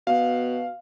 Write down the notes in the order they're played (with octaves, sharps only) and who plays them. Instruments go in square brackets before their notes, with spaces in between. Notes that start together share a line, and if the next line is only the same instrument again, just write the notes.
[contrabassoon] B2 [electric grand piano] F5